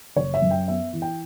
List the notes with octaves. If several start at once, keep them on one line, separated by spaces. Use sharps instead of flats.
F#1 C#5
E5
F#2
G5
B3 E5
E3
G5